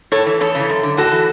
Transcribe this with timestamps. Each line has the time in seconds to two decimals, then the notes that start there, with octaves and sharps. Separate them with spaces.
0.12 A2 A4 C#5
0.26 E3
0.40 E2 A4 C#5
0.55 C#3
0.60 E3
0.70 F#2
0.83 D3
0.97 A2 F#4 A4
1.12 E3